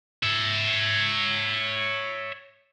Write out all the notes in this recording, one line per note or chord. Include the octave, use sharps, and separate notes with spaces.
C#5 E5